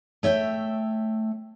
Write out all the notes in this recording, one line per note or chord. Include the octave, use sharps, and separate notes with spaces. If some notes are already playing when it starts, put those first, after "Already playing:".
A3 C#5 E5 G5